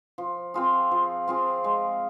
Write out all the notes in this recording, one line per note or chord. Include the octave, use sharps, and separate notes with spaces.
F3
C4 F4 G#4
F3
C4 F4 G#4
G#3